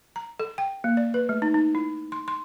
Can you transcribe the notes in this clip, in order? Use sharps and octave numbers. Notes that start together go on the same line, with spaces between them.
A#5
A4
G5
A#3
D5
B4
A3
D#4
D#4
E4
C6
C6